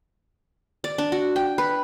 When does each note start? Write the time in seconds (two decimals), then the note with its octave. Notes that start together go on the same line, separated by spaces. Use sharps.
0.84 D5
0.98 D4
1.12 F#4
1.36 G5
1.58 B4